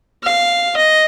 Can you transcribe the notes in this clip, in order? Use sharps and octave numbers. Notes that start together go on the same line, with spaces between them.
F5
D#5